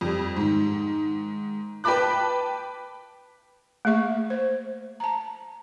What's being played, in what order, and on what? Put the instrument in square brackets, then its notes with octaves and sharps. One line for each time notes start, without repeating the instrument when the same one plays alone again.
[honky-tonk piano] F2 G3
G#2 D#3
B4 G5 A5 B5 D6 F#6
[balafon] A3 A#3 G#4 E5 C#6
C5
A5 A#5